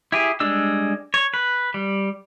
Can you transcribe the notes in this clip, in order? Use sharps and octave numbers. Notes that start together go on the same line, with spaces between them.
E4 G4 G#4
G3 G#3 D4 E6
C#5
B4
G3